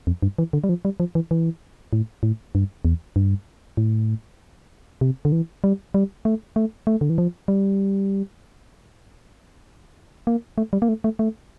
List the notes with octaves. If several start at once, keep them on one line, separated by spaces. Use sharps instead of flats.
F2
G2
E3
D3
G3
F3
G3
F3
E3
E3
A2
A2
G2
E2
G2
A2
C3
D3
E3
G3
G3
A3
A3
A3
D3
E3
F3
G3
A#3
A3
G3
A#3
A3
A3
A3